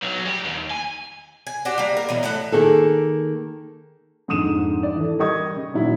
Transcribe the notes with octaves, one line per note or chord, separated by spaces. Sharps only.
B1 F#3
G3 G4
D#2
G#5
G#5
D4 F#4 G4 C5
G3 A#3
A#4
B2 E3 F#3
A2 A3 A4 F#5
D#3 A#3 G#4 A4
F2 G#2 D3 D#6 D#7 E7
D5
E3 A4
G3 A#4 D#5 C#6 D#6 G#6
C#3
A#2 D#3 F#3 E4